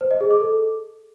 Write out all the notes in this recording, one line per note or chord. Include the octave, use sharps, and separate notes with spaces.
C5
D#5
G#4
D6
A4